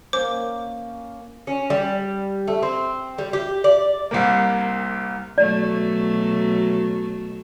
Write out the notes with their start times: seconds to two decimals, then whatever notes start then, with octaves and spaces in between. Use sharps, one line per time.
0.13 A#3 C#4 C5 D6
1.47 C#4
1.70 G3
2.48 A3
2.63 C4
3.18 G3
3.33 G4
3.64 D5
4.11 C2 C3 A#3
5.38 B2 F#3 A3 D5